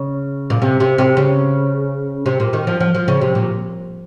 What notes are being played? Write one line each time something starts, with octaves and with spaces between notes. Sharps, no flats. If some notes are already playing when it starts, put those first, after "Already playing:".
Already playing: C#3
A#2
C3
C3
C3
C#3
C3
A#2
D#3
F3
F3
F3
C#3
C3
A#2